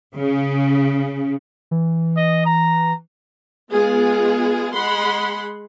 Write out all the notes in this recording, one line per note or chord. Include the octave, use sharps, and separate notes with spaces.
C#3
E3
D#5
A#5
G#3 B3 F4 G#4
G#3 F#5 B5 C6